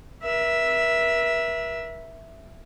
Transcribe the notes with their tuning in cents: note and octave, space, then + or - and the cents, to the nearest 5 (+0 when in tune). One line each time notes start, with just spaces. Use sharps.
A#4 +45 E5 +0